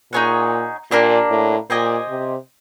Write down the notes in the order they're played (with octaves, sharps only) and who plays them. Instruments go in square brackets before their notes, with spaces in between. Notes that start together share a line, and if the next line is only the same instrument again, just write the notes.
[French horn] A#2 [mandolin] D#4 G#4 C#5 F#5
[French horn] A#2 [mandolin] A#3 D4 G4
[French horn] A2
[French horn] A#2 [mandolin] G4 C5 D#5 G#5
[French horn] C3